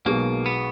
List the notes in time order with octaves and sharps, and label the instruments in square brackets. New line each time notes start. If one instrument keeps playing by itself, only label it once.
[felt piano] B1 B2 G#3 [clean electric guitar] A#3
[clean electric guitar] B3